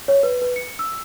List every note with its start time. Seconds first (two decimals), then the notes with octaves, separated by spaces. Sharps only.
0.08 C#5
0.23 B4
0.42 B4
0.56 C#7
0.79 E6